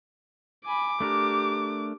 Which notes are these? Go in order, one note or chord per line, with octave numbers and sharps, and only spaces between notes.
G#5 B5 D6
A3 D4 G4 A#4